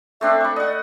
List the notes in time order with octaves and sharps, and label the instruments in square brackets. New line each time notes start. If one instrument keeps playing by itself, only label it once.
[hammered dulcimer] A3 C4 D4 [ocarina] E5
[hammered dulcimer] B5 C#6
[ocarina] D5 [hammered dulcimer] D#5 F#5